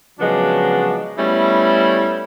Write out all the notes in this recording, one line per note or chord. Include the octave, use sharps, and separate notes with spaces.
C#3 F3 F#3 G#3 B3 D4
G3 A3 B3 C#4 E4